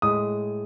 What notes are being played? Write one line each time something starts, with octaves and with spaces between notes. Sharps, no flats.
A2 G#3 D#6